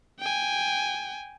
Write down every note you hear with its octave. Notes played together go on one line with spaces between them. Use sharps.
G5 G#5